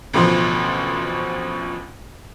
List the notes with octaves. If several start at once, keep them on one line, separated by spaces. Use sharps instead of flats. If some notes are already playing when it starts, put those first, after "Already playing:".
A1 D2 B2 F3 C6